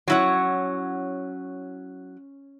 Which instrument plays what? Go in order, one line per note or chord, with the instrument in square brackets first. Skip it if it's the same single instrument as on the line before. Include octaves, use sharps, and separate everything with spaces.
[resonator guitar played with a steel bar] F#3 E4 F#5 [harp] C#4 C#5